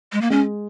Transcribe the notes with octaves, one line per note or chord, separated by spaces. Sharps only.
G#3
A#3
G#3 C#4